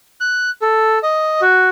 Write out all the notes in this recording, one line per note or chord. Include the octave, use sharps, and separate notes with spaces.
F#6
A4
D#5
F#4